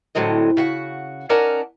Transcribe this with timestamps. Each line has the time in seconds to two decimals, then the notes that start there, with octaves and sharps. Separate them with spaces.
0.15 A2 D3 F#3 C4 D#5
0.57 C#3 F#4 F#5
1.29 C#4 D#4 A#4 D5 F#5 A5